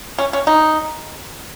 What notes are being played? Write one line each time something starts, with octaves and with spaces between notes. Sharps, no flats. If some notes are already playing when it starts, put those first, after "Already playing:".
C#4
C#4
D#4